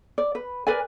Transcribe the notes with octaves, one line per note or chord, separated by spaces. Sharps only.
D5
B4
A#4 B4 D5 G#5